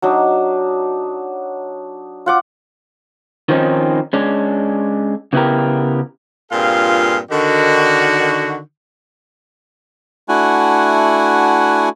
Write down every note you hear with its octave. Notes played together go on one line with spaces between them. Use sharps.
F#3 D4 D#4
F4 F#5 D6
D#3 F3 C4 C#4 D#4
G#3 C#4 D4
C#3 B3 E4 G4 A#4
G2 A#2 C4 F4 G#4 F5
D3 D#3 F#4
A3 D4 E4 F#4 F#5 G#5